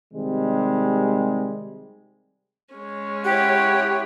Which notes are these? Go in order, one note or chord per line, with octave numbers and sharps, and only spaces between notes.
C3 D#3 G3 G#3
G#3 C#4
E4 G4 C#5 F#5